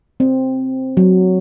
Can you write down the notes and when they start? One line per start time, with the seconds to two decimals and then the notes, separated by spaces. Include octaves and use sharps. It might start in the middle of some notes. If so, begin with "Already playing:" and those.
0.20 C4
0.97 F#3